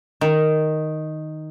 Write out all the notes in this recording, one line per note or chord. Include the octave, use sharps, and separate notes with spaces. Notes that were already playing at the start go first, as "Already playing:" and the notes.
D#3